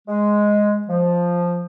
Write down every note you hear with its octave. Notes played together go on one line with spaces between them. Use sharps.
G#3
F3